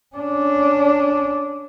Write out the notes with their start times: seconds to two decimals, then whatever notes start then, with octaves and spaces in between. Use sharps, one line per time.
0.16 C#4 D4